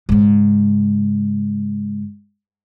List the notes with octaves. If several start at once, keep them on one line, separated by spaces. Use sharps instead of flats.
G#2 C#3